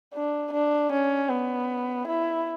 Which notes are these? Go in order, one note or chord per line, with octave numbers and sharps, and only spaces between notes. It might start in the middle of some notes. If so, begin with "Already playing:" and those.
D4
D4
C#4
B3
E4